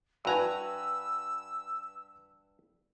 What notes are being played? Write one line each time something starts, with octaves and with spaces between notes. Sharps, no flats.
G2 F#4 B4 G#5 A#5 E6